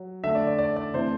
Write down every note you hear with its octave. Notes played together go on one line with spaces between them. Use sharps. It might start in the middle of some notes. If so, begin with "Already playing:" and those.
Already playing: F#3
D3 A3 E5
D5
D5
D5
D5
C3 E3 A3 C5